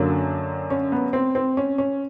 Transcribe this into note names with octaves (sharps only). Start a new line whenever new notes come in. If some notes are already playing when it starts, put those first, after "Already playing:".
Already playing: F#2 D3 F#3 A#3 D4
C#4
B3
C4
C4
C#4
C#4